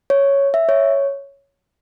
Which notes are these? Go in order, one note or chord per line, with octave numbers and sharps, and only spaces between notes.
C#5
E5
C#5